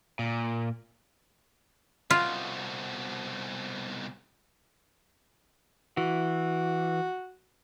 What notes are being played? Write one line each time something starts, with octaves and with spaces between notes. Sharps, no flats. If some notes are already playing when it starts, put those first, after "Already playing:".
A#2
C2 B2 F4
E3 F#4